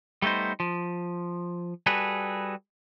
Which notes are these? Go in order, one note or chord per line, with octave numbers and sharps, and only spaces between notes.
G3 A3 B3 D#4 C5
F3
G3 F#4 G#4 A4 B4